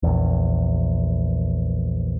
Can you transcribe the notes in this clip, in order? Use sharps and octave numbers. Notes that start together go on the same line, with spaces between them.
A#1 E2